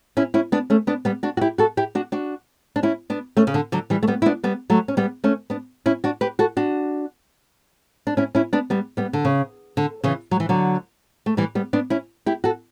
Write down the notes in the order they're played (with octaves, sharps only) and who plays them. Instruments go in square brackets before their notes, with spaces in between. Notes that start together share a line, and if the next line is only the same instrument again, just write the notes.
[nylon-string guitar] C#4 E4
C#4 E4
B3 D4
A3 C#4
B3 D4
G3 B3
D4 F#4
F#4
E4 G4
F#4 A4
E4 G4
D4 F#4
D4 F#4
D4
C#4 E4
B3 D4
A3 C#4
C#3
D3
D3 F#3
E3 G3
A3
G3 B3
E4
B3 D4
G3 B3
F#3 A3
C#4
G3 B3
A3 C#4
B3 D4
C#4 E4
D4 F#4
G4 B4
F#4 A4
D4 F#4
D4
C#4 E4
C#4 E4
B3 D4
G3 B3
G3 B3
D3
C#3
D3
C#3 E3
F#3
E3
D3 F#3
A3
E3 G3
G3 B3
B3 D4
C#4 E4
E4 G4
F#4 A4